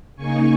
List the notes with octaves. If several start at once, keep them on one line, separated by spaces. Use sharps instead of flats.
C#3 A#3 D#4 G#5 C#6